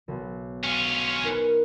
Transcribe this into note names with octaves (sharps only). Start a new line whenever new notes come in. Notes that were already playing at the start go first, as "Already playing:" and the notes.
B1
C#4 F4
D#4 A#4 B4